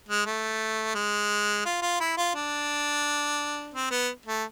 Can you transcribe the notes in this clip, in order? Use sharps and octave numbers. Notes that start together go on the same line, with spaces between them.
G#3
A3
G#3
F4
F4
E4
F4
D4
C4
B3
A3